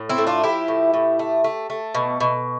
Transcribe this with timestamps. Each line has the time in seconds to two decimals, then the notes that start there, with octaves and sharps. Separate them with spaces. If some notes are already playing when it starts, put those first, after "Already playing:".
Already playing: A2
0.09 C4 E4
0.18 A3
0.27 D4 F4
0.43 F3 E4 G4
0.68 A2
0.94 A2
1.19 A3
1.44 A3
1.70 A3
1.95 B2
2.20 B2